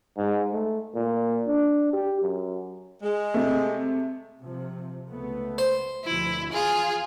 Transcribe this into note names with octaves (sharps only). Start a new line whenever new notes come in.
G#2
A3
A#2
D4
G4
F#2
G#3
C3 A3
C3 F3
C#2 A3 B3
C5
D2 B2 F3 E4
E2 F4 G#4